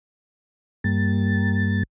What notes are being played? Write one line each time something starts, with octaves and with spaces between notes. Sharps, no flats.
G2 G3 A#3 A6